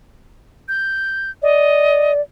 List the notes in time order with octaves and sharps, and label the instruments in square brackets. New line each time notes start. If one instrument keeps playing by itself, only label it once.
[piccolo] G6
[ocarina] D5 [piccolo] D#5